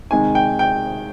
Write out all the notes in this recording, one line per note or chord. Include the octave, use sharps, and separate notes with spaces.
C3 D#3 G#3 G#5
G5
G5